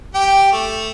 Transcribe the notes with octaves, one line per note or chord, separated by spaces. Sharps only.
G4 G5
A3